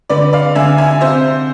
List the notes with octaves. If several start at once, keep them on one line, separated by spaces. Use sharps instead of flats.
D3 B4 D5
D5 F5
D3 E5 G#5
E5 G#5
C3 C5 E5